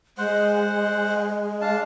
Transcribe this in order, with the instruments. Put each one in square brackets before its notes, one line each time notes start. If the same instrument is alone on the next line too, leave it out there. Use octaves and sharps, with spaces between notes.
[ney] G#3 [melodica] C5 F#5
[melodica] D4 F5 A5